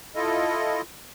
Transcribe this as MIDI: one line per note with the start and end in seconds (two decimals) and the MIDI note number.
0.15 0.81 64
0.15 0.81 65
0.15 0.81 69
0.15 0.81 75